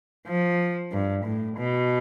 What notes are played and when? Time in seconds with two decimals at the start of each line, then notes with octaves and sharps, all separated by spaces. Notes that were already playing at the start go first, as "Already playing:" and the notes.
0.27 F3
0.92 G2
1.25 A2
1.58 B2